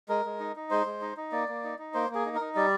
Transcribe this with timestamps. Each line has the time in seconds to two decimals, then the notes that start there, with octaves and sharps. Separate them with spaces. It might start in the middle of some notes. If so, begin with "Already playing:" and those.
0.09 G#3 A#4
0.25 G#3
0.40 D#4
0.56 D#4
0.71 G#3 C5
0.86 G#3
1.02 D#4
1.17 D#4
1.32 A#3 D5
1.49 A#3
1.64 D#4
1.79 D#4
1.94 A#3 C5
2.10 A#3 G#4
2.26 D#4
2.35 A#4
2.41 D#4
2.56 G3 D5